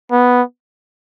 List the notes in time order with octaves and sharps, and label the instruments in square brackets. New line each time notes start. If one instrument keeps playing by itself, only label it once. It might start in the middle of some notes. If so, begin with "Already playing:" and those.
[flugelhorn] B3